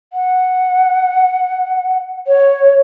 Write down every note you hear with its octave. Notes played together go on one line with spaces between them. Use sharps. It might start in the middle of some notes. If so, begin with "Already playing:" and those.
F#5
C#5